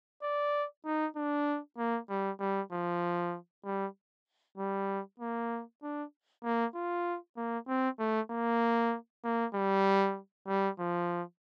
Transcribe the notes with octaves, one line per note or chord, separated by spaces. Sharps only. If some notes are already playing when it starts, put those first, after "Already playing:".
D5
D#4
D4
A#3
G3
G3
F3
G3
G3
A#3
D4
A#3
F4
A#3
C4
A3
A#3
A#3
G3
G3
F3